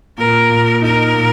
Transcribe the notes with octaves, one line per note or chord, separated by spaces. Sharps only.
A#2 A#4
A#2
D#4 A#4
A#2